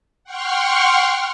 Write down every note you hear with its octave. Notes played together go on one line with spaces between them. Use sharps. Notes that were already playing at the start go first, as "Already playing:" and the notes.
F#5 G5 C6 C#6 F6